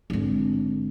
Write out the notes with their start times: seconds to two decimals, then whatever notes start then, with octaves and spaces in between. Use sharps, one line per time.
0.10 G#1 D3